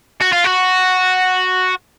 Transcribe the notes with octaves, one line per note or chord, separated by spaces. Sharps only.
F#4
F4
F#4